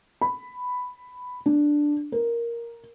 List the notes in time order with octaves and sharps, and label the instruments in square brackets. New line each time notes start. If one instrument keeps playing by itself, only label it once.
[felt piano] B5
D4
A#4